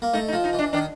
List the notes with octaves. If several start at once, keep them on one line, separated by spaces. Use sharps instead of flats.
A#3
A3 D#4
D#4
F3
D#4
E3
D4
D#3 D4